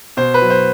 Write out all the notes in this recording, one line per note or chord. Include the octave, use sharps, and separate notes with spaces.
B2 C5
B4
F#3
C5